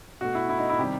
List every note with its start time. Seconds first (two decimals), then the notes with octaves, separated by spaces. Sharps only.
0.21 B2 A3 F#4
0.35 E4
0.49 E4
0.59 D#4
0.70 E4
0.79 C3 D#3 G3 G4